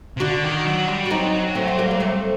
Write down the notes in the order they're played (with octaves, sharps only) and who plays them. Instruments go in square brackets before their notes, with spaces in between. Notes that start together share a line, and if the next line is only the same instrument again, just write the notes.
[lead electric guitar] C3
[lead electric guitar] D3 [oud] D4 F#4
[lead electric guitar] D#3
F#3
G3
[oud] F#4
[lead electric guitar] F#3 [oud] C4 D#4
[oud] A3 C4
C4
G3 A#3
A#3
A3 C4